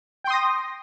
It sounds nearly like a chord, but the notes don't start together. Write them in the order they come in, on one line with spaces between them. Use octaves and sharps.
G5 C6 D#6 A#6